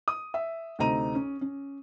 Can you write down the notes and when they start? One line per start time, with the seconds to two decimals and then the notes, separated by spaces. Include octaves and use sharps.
0.08 D#6
0.34 E5
0.79 D2 C3 D#4 A#5 D#7
1.15 C#4
1.41 C#4